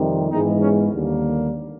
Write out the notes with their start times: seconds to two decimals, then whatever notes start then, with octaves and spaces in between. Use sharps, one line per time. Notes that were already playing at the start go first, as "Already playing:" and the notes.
Already playing: F2 C3 D#3 G3
0.31 G#2 E3 G#3 B3 D#4
0.61 C#4
0.91 D#2 D3 G3 A#3